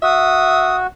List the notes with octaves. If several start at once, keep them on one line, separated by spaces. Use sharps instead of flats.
F#4 E5 D#6